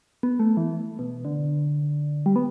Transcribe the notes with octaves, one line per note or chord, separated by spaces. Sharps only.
B3
A3
E3
B2
D3
G3
B3